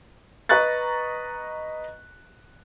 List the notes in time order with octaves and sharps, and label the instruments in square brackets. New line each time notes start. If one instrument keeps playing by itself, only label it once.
[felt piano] B4 D#5 A#5 C#6 F#6 A6